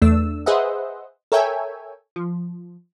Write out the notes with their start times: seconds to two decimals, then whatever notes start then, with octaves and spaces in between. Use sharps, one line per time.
0.02 E2 A3 D4 E6
0.46 G#4 B4 C5 D#5 E5 F#5
1.32 A4 A#4 C#5 E5 G5 G#5
2.16 F3